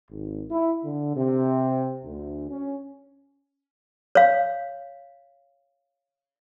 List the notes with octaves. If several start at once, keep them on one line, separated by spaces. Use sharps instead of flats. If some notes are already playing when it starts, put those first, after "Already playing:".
G#1
E4
D3
C3
D2
C#4
C#5 F5